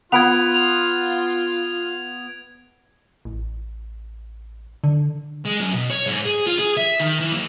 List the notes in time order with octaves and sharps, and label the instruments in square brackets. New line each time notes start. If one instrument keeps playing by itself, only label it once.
[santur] B3 B4 [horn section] F4 [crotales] G#6 D7 F7
[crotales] F7
[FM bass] A1
D3
[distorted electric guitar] G#3
F#2
B2
C#5
G#2
G#4
F4
G#4
E5
D#3
E3
D#2